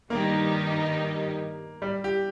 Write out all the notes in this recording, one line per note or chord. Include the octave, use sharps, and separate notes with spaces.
G2 D#3 G3 A#3 D#4 G4
G3
G4